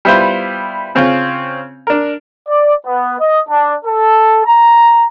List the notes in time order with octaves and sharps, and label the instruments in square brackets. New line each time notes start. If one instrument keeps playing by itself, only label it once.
[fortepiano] G3 B3 E4 F4 C5
C#3 C4 C#4 F4
D4 A#4
[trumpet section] D5
B3
D#5
D4
A4
A#5